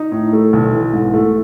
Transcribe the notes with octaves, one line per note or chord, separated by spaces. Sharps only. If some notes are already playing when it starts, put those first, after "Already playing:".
Already playing: D#4
A2
A3
B1
E3
G#2
A3